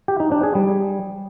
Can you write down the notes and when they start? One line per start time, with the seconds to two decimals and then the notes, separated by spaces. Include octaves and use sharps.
0.08 G4
0.20 D#4
0.32 D4
0.43 G#4
0.55 G3